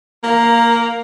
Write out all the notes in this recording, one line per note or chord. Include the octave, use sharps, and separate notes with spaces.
A#3 A#4 F5